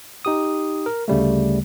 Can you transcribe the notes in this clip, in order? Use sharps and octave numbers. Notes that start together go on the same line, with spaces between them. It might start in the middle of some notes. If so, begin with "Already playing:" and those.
D#4 G4 D#6
A#4
D2 C#3 G3 A3